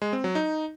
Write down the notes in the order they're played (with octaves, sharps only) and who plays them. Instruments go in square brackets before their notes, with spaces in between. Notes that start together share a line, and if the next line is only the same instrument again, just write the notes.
[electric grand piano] G#3
C4
F#3
D#4